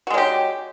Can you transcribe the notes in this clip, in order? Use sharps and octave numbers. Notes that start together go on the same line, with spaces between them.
F#3 G#3 F#4 G4